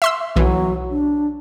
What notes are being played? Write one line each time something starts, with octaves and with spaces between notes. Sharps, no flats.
E5 C6 E6
B1 E3 F#3
D4